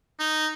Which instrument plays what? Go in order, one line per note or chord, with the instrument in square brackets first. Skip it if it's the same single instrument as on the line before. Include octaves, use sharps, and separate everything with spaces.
[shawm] D#4